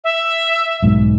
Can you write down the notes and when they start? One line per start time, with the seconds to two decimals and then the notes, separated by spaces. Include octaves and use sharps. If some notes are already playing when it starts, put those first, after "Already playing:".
0.04 E5
0.82 B1 G#2 B2